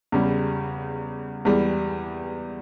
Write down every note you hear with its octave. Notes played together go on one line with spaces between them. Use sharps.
E2 C#3 G3
E2 E3 G3